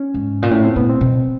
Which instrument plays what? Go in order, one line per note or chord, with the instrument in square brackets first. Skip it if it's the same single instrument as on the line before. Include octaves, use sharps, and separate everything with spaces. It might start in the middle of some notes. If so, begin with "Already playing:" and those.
Already playing: [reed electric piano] C#4
[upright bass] G#2
A#2
[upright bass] A2 [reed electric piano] C#4
[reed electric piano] C4
[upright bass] A#2 [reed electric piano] B3
[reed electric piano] C4
[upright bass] B2